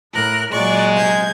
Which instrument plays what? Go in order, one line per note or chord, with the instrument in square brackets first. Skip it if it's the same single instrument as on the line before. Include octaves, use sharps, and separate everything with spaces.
[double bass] A2 [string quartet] A#4 F#6
[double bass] A#2 F#3 [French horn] G#3 [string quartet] D5 C#6 F#6
[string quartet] C3 G6 G#6